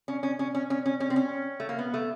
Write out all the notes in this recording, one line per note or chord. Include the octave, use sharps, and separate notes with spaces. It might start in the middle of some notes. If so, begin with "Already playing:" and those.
C#4
C#4
C#4
C#4
C#4
C#4
C#4
C4
C#4
A3
A#3
B3
A3